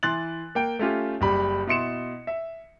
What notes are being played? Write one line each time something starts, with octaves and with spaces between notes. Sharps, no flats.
E3 C6 F#6 A6 F#7
A#3 G5
A3 C#4 F4 G4
F#1 G3 B5
B2 E4 C6 C#7 E7
E5